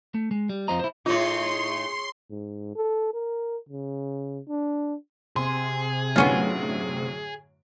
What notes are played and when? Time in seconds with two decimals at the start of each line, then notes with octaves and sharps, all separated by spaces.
0.14 A3
0.31 G#3
0.49 G3
0.68 F2 F4 C5 D#5 A#5
0.80 E4 C5
1.06 A2 D#4 F4 G#4 C#5 C6
2.30 G#2
2.75 A4
3.14 A#4
3.69 C#3
4.49 D4
5.36 C3 G#4 C6
6.16 F#2 A2 D3 B3 C#4 F4